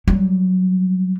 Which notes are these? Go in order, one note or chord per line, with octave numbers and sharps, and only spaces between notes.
F#3 G3